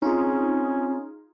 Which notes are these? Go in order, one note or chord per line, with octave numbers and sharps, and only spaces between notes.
C4 C#4 D#4 F4 G#4